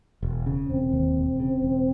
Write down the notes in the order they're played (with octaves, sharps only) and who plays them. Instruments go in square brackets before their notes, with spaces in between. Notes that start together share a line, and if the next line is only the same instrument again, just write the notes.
[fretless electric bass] E1
C#3
[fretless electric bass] E1 [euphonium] C4
[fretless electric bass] D#2
E1
C#3
E1